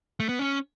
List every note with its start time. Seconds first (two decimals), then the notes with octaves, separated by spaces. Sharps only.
0.20 A3
0.29 B3
0.39 C#4